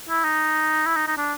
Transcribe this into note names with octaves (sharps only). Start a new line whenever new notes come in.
E4
D#4
E4
D#4
D#4
D4